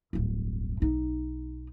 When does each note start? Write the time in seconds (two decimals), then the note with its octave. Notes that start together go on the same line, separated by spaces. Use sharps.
0.13 D1 G1
0.80 B1 D#4